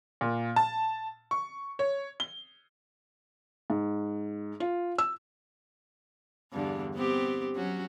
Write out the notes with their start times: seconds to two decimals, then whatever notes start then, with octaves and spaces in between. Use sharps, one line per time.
0.21 A#2
0.56 A5
1.31 C#6
1.79 C#5
2.20 G7
3.70 G#2
4.60 F4
4.98 E6
6.53 E2 G2 D3
6.95 B3 C4 G4
7.56 F#3 C#4 F#4